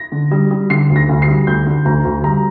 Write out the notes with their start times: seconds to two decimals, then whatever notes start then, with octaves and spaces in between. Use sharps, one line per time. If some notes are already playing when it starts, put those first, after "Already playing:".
Already playing: A#6
0.12 D3
0.31 G3
0.51 G3
0.70 D3 C7
0.90 D2
0.96 A#6
1.09 D2
1.22 C7
1.28 G3
1.47 D2 G6
1.66 D3
1.85 D2 A#5
2.05 D2
2.24 G3 A#5